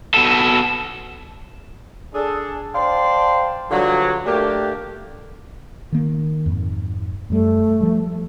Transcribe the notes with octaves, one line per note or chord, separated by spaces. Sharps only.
B2 A4
D4 G#4 A4
C5 D5 F5 G5 A5 C6
G2 D3 F3 F#3
A3 A#3 D4 G4
D#3 A#3
F2 G#2
F#2 G3 A3
F3 G3